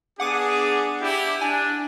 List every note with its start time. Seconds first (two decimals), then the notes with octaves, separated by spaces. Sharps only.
0.20 B3 D4 G#4 F#5 D6 D#7
1.01 D4 E4 G4
1.41 D4 G#5